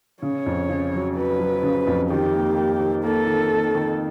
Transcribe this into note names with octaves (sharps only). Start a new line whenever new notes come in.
C#3 C#5
F2
C#3
F#3
F#3 B4
F#3
C#3
F2
D#3 G4
A#3
A#3
D#3
A#3 A4
D#3
A#3
D#3